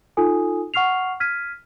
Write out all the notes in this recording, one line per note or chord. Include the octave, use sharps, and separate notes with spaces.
D#4 F4 A4 G#5 D#6
F#5 C#6 F6 C7 F7
F6 G#6 B6 D#7